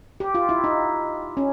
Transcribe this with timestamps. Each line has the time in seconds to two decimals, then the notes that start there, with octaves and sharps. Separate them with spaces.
0.20 G4
0.35 F4
0.49 E4
0.64 D#4
1.37 C#4